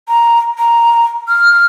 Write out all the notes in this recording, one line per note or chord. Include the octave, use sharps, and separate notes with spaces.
A#5
A#5
F6